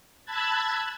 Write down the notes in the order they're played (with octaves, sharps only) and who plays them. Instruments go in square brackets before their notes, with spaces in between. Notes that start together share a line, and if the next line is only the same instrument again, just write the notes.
[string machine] A5 B5 E6 F#6 G#6 A6